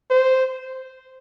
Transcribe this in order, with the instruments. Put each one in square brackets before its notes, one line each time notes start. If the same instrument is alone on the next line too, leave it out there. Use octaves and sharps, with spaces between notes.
[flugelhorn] C5